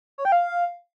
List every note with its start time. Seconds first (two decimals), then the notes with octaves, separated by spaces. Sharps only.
0.18 C#5
0.25 G5
0.32 F5